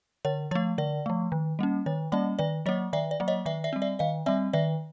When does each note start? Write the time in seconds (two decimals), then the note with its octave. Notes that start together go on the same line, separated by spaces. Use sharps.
0.25 D3 C#5
0.51 F3 C#5
0.55 A3
0.78 D3 D5
1.06 F3 A3
1.32 D#3
1.59 G3 A#3 C#4
1.86 D#3 C#5
2.12 G3 A#3 C#4 D5
2.39 D#3 D5
2.66 F#3 A#3 C#5 D#5
2.93 D#3 D5 E5
3.11 D5
3.20 F#3 A#3
3.28 C#5 D#5
3.46 D#3 D5 E5
3.64 D5 E5
3.73 G3 C4
3.82 D5 E5
3.99 D#3 D#5 F5
4.26 G3 C4 D5 E5
4.53 D#3 D5 E5